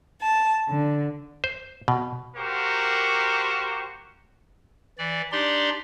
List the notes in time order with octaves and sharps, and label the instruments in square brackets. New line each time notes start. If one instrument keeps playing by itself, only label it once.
[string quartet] A5
D3
[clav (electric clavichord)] C5
B2
[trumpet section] A#3 F#4 G4 A#4 C5 C#6
[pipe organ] E3 D5
D4 D#4 G4 D5 C6